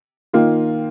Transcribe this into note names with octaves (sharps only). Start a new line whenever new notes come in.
D#3 A#3 F4